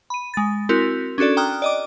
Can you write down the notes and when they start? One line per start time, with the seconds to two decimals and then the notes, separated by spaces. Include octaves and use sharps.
0.10 B5 D#7
0.34 G#3 A6
0.69 C4 E4 F#4 A#4
1.18 C#4 D4 F#4 A4 D5
1.37 G5 A#5 D#6 F6 F#6
1.62 D5 D#5 D6